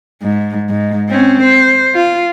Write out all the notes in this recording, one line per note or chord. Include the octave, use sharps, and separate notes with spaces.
G#2
G#2
C4 C#4
C5
F4